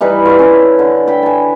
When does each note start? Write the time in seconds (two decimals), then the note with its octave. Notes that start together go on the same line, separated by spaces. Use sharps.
0.01 E3 G3 D#4 B4
0.26 F4 A4 D5
0.39 C#4 E4
0.79 D3
1.08 G5 B5
1.23 G#5 A5